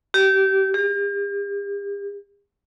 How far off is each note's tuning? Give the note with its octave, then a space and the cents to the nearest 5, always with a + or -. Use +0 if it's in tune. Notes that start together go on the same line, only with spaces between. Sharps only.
G4 -25
G4 +45